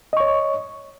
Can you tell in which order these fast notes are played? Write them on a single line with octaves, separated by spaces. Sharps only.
D#5 C#6 C#5